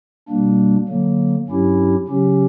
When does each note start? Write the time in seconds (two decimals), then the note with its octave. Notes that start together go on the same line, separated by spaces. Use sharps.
0.29 B2 G3 A#3 D4
0.88 D3 F#3 A#3
1.48 G2 F#3 C#4 E4 G4
2.08 C#3 F#3 C#4 G4